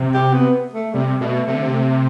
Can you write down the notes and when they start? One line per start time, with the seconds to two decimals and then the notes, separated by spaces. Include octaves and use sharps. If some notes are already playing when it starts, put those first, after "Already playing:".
Already playing: C3
0.14 G4
0.33 B3
0.74 A3
0.93 C3 G3
1.20 B2 A3
1.47 C3 A3
1.55 D3
1.62 C3
1.74 A3